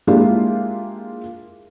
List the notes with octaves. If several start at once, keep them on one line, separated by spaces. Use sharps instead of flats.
G#3 A#3 D4 E4 F4 G4